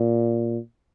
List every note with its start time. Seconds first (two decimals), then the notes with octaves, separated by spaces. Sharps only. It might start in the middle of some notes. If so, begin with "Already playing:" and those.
Already playing: A#2